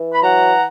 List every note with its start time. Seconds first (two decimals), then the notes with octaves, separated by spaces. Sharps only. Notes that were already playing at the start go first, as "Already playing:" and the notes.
Already playing: E3
0.13 B5
0.23 F#3 F#5 A#5